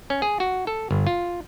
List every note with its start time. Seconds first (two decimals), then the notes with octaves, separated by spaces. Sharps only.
0.10 C#4
0.22 G#4
0.40 F#4
0.67 A4
0.91 G1
1.07 F4